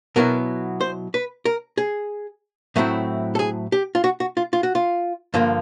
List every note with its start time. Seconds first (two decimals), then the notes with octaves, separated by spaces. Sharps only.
0.16 B2 F#3 B3 E4 A#4
0.81 C5
1.14 B4
1.45 A#4
1.78 G#4
2.76 A2 F#3 A3 C4 E4
3.35 A4
3.39 G#4
3.72 G4
3.95 F4
4.04 F#4
4.20 F#4
4.37 F4
4.53 F4
4.63 F#4
4.75 F4
5.34 G2 D3 F3 A#3